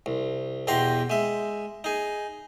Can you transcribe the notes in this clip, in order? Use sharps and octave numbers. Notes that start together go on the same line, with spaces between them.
C2
E2 B2 G4 G5 A#5 C6
G#3 E5
D#4 G#4